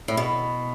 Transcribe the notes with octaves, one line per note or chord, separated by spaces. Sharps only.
A2
B2